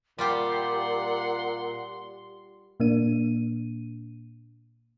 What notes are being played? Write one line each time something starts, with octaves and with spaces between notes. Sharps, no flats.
A#2 G3 F4 G4 F#5 C6
A#2 A#3 D4 D#7